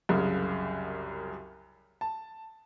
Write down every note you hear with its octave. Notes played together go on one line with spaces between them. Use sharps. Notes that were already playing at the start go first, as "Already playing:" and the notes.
C2 F#2 C#3
A5